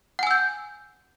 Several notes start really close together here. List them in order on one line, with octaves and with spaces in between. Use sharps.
F#5 G#5 E6 G6